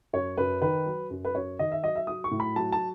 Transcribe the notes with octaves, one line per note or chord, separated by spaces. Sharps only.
F#2 C#5
F#2 B4
D#3 B4
F#3
F#2
B4
F#2 C#5
D#3 D#5
E5
F#3 D#5
E5
F#3 D#6
C#6
A2
B5
F#3 A5
A5